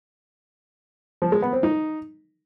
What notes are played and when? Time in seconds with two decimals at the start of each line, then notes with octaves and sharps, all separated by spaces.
1.22 F3
1.32 G#3
1.42 B3
1.53 C4
1.63 D#4